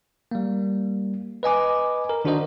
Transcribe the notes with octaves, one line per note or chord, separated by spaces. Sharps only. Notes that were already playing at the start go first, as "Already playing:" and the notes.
G3 A#3
B4 D#5 G#5 D6
A#4
D#3 D4 F#4 A#4 C5 D#5